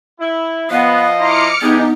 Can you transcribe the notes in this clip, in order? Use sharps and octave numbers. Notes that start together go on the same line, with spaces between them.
E4
F3 B3 D#5 F5
E4 A#5 C6 D6 F6 C#7
E3 G3 B3 D4 D#4 G4 G#4